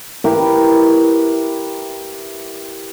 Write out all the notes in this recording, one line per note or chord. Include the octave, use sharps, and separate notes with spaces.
E4 G4 A#4 B4